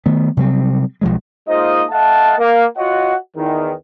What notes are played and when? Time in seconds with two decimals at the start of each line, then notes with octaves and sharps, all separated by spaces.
0.06 D#3 A3 B3
0.37 C3 F#3 G3 C4
1.01 B1 F3 G#3
1.48 G#3 A#3 D#4 F4 C5 D#5
1.91 A3 D#5 F5 F#5 A5
2.39 A#3
2.78 F4 F#4 C#5 D#5 F#5
3.37 E2 D#3